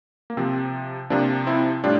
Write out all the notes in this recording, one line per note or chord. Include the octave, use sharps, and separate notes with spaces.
A#3
C3 F3 C4
C3 F3 A#3 D4
C4 E4
A2 G3 D4 F4